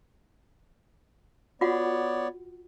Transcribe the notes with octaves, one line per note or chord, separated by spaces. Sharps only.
B3 F4 F#4 C#5 D5 F#5